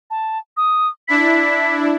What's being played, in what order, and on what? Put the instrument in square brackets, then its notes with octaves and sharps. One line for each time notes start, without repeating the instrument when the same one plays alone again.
[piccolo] A5
D#6
[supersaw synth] D4 E4 [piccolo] B6